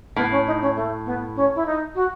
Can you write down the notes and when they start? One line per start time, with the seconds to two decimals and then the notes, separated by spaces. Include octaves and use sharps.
0.16 A2 B3
0.31 C#4
0.47 D#4
0.62 C#4
0.76 A3
1.06 B3
1.36 C#4
1.55 E4
1.66 D#4
1.95 F#4